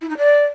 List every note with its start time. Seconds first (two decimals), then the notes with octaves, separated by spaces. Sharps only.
0.01 E4
0.09 D#4
0.17 D5